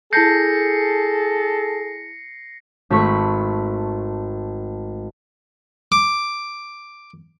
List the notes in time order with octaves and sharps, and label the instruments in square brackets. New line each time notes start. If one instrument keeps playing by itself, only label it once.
[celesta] E4 A5 G6 [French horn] G#4 [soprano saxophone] A4 [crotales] A#6 C7 C#7
[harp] G#1 A3 B5 C#6
[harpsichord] D6